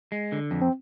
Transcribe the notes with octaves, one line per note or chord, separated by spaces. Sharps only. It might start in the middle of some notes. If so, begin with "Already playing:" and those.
G#3
D3
F2
C4